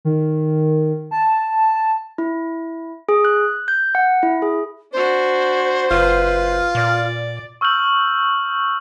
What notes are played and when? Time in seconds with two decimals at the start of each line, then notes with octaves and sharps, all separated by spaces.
0.05 D#3
1.11 A5
2.18 E4
3.09 G#4
3.25 F#6
3.68 G6
3.95 F#5
4.23 E4
4.42 G#4
4.93 D4 F#4 C5
5.91 F#1 F4 B4
6.75 A#2 D5
7.61 C#6 E6 F6 G6 F#7